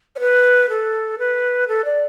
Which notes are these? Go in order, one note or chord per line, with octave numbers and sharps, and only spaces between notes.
C#5
B4
A4
B4
A4
D5